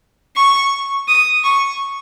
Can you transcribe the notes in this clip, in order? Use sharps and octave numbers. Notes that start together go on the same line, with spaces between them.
C#6
D#6
C#6